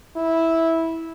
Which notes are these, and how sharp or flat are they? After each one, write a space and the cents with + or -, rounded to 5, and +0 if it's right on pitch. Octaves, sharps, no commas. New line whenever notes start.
E4 -10